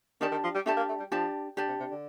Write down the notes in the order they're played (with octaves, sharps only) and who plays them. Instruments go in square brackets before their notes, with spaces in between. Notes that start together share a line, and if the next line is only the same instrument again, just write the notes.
[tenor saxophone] D#3 [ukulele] D4 G4 D5 A5
[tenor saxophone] D#3
F3
G3
[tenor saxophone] A3 [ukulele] D4 G4 D5 A5
[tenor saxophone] A#3
A3
G3
[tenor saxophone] F3 [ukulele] D4 G4 D5 A5
[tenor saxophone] D3 [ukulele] D4 G4 D5 A5
[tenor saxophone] C3
C3
D3